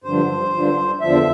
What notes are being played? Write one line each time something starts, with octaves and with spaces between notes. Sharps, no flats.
G2 D3 F3 C5
G2 D3 F3
E2 D3 F3 E5